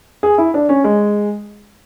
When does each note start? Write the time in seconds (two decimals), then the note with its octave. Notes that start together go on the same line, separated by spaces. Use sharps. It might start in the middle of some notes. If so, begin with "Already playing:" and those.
0.23 G#4
0.38 E4
0.54 D4
0.69 C#4
0.84 G#3